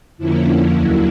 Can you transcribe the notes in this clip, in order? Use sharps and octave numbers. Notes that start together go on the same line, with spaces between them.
F2 D3 F3 A#3 C#4 E4
D#2 D3 F#3 A#3